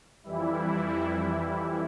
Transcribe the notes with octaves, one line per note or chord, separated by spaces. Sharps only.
F2 E3 G3 E4